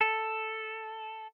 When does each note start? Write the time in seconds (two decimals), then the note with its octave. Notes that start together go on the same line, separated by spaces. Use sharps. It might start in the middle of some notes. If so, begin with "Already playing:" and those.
0.01 A4